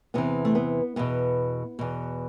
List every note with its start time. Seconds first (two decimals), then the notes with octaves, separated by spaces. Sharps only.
0.14 E2 C3 E3 B3
0.45 A3
0.55 B3
0.96 E2 B2 B3
1.79 E2 B2